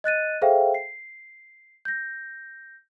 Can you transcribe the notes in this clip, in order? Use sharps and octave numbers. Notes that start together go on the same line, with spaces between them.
D#5 F#6 A6 D#7
G#4 A4 C5 E5 F5 G5
C7
G6 A#6